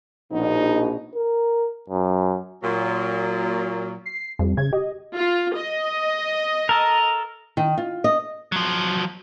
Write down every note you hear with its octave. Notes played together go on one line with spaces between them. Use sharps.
A#1 B2 D#4
A#4
F#2
A#2 F#3
C7
F2 G3
C#3 G#6
G4 D#5
F4
D#5
A4 A#4
D#3
F4
D#5
F3 F#3